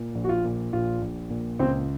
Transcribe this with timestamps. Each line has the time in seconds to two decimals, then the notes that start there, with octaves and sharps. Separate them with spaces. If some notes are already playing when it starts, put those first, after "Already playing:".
Already playing: A#2
0.15 A#1
0.24 F#4
0.29 F4
0.44 A#2
0.73 A#1 F4
1.02 A#1
1.30 A#2
1.59 C#2 C4 C5